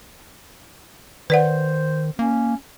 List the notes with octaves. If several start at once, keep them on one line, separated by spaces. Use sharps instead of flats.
D#3 B4 C5 D5 F#5
A#3 C#4